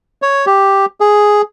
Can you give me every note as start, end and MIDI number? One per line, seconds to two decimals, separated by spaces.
0.22 0.45 73
0.46 0.86 67
1.00 1.42 68